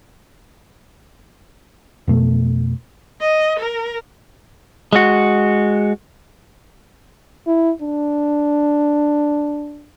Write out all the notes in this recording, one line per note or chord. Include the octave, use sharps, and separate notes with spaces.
F2 B2 A3
D#5
A#4
G#3 F#4
E4
D4